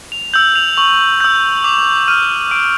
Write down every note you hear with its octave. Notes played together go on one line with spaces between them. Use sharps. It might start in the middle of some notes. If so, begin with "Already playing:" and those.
F7
E6 G6 F#7
F7
C#6 F#7
E6 G6
D6 F7
F6 D#7
D6 D7